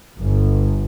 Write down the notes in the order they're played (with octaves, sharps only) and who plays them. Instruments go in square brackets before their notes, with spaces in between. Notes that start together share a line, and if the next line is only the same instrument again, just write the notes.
[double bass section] G1